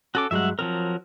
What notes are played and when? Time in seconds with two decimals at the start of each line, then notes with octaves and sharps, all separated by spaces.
0.15 C#4 F#4 A4 D6
0.31 G2 F#3 G#3 E5 F#5
0.59 F3 F#3 C4 A#4